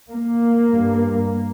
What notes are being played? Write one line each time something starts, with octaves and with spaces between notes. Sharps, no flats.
A#3
G2